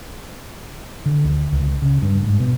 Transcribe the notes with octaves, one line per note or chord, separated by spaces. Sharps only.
D3
D2
C#2
C#3
G2
G#2
B2